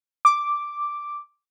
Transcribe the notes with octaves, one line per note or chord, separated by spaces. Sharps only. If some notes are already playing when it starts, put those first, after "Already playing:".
D6